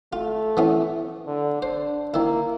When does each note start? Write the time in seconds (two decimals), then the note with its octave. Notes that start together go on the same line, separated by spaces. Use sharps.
0.13 A3 F4
0.57 E3 B3 C#4
1.27 D3
1.62 D4 C5
2.14 D#3 A#3 E4